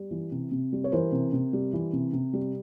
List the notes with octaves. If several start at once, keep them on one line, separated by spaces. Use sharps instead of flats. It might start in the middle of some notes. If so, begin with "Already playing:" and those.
Already playing: G3
E3
C3
C3
G3
C#5
E3 A#4 C5
C3
C3
G3
E3
C3
C3
G3